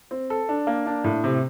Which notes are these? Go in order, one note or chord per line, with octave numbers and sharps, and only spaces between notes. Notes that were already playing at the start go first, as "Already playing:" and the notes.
C4
A4
D4
A#3
D4
A2
C3